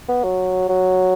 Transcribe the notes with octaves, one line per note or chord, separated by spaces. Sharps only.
B3
F#3
F#3